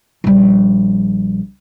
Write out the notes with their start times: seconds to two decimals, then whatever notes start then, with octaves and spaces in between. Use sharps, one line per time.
0.24 A#1 G3